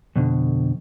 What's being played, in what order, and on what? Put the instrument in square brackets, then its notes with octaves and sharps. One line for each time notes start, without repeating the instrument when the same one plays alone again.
[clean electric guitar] F2 B2 D3